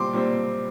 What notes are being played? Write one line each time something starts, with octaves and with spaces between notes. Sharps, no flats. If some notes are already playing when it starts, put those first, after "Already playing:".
Already playing: A#2 G3 C4 C6 D6
A#2 G3 C4